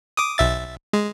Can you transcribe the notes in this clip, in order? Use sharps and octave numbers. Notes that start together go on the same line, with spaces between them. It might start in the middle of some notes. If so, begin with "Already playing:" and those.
D6 D#6
B1 E5 A6
G#3